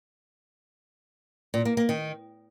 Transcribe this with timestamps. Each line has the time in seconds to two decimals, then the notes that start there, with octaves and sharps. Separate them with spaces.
1.54 A#2
1.65 A#3
1.77 A#3
1.89 D#3